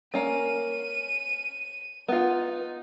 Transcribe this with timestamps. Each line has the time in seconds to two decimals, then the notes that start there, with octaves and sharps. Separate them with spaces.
0.14 A#3 C#4 D#7
2.08 B3 D#4 F4